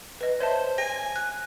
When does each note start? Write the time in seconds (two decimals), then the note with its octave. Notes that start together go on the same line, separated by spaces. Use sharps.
0.21 B4 D#5
0.40 C5 C#5 E5 A5
0.78 G#5 A#6
1.16 F#6